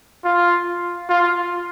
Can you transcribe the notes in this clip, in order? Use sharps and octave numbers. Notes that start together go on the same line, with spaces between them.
F4
F4